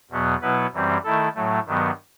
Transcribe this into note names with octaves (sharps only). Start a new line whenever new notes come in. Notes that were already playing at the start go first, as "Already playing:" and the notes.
E2 B2 F#3 B3
B2 F#3 B3 E4 B4
F#2 E3 G3 C4
D#3 A3 E4 A4
A2 F#3 A3
G2 D#3 F#3 B3